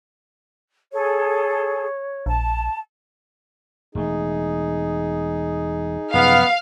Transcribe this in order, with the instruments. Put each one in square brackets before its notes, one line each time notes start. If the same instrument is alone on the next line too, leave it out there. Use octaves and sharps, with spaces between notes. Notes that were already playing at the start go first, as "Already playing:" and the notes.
[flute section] G#4 A4 [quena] C#5
[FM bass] A#1 [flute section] A5
[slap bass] E1 A3 [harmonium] D#4 G#4
[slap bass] F#2 C3 F3 [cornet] B3 [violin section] F5